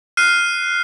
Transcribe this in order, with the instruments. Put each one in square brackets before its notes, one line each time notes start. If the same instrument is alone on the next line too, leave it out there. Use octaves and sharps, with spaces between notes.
[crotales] F6 F#6 C7 D#7